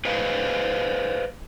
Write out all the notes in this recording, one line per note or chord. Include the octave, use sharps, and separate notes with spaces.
G#4 B4 C5 D#5 F5